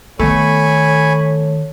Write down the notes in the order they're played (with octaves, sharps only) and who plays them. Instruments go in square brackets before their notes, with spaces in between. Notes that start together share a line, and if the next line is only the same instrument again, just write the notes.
[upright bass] D#3 B3 [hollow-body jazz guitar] A3 [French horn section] A4 C#5 [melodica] G#5 B5 C#6